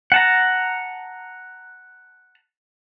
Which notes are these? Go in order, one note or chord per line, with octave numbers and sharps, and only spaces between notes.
F#5 A5 A#5